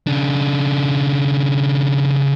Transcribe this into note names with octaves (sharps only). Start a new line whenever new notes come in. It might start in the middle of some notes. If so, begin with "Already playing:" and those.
C#3 D4